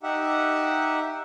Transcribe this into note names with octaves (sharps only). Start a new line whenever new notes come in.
D#4 G4 E5 F#5